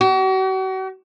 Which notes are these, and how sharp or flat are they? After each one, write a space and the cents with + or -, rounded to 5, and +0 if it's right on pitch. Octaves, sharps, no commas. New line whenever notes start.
F#4 +40